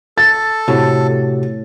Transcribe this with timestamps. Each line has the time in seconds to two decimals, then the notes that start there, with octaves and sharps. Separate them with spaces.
0.18 A4 A6
0.68 A2 C3 F#4 G4